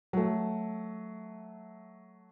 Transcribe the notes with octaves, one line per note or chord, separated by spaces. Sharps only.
F#3 A3